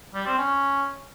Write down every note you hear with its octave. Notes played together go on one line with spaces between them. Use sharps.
G3
C4
C#4